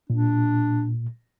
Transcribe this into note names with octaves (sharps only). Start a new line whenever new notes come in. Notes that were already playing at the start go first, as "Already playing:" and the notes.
A#2 D4